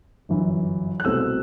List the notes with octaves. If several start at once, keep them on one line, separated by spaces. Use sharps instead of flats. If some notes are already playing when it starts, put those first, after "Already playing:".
G1 F#2 E3
F#6
C2 B2 A3 C4 E6